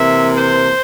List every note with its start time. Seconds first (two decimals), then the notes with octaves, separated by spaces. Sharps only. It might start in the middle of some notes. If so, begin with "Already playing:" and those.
Already playing: C3 E3 A#3 E5
0.34 C5